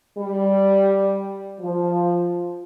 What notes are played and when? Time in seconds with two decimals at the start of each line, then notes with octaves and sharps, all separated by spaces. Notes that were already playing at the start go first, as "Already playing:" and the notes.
0.18 G3
1.61 F3